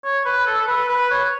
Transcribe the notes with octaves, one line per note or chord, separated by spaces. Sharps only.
C#5
B4
A4
A4
B4
B4
C#5